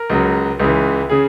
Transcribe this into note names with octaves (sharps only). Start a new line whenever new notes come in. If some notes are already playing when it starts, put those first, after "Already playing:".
Already playing: A#4
C#2 C#3 F#3
C#2 C#3 E3
C#3 G#4